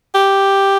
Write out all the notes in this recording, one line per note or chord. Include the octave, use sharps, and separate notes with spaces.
G4